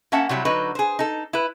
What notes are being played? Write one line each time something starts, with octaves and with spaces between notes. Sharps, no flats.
A#3 C#4 E5 F#5 A5
C3 F#3 G3 E4
D3 F#3 D#4 B4
G#4 C5
D#4 A4
E4 B4